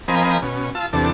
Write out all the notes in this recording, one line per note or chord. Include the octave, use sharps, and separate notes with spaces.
F3 C4 A#4 D#5 G#5 B5
B2 C#4
F4 A5 E6
E2 C3 D4 A4